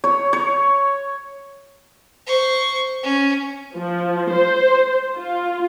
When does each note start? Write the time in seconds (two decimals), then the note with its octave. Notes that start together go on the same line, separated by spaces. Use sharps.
0.04 C#5
0.33 C#5
2.27 C5 C#6
3.03 C#4
3.76 F3
4.33 C5
5.15 F4